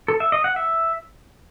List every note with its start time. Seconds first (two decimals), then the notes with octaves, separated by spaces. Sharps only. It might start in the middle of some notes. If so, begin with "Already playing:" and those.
0.08 A4
0.20 E5
0.32 D#5
0.44 F#5
0.56 E5